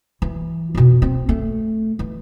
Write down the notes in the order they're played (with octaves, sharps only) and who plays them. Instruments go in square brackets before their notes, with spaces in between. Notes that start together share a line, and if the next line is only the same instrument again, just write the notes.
[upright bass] E3
F2 B2
C4
A3
E3